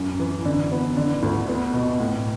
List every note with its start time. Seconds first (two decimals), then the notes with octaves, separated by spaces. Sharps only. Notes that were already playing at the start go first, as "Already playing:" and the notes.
Already playing: F#2
0.20 E3
0.45 D3
0.71 B3
0.97 D3
1.23 D2
1.48 B3
1.74 B2
2.00 A2